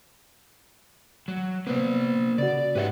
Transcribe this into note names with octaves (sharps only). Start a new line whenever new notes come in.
F#3
C3 A#3 B3 C5
C#3 F#4 D5
G#2 G4 B4 C#5 E5 F#5